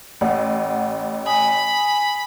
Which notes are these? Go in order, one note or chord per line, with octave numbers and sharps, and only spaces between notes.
A1 F#5
G#5 B5 D#6